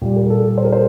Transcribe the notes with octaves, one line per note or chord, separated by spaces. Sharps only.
A#2 G3 G4
A#4
A4
C5
A#4
C5